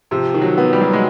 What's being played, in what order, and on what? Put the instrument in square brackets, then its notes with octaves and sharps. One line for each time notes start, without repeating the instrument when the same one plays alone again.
[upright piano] C3 [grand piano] F3
[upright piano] D#3
[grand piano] F#3
[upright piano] B3
[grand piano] G3
[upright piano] F#3
[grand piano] G#3